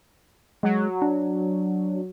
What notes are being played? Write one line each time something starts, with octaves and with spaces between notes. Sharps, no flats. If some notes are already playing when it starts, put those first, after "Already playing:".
F#3 G#3
D4